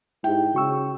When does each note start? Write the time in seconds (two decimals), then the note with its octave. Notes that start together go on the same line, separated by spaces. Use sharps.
0.24 G#2 E4 G4 G5
0.55 C#3 F#4 C#6 E6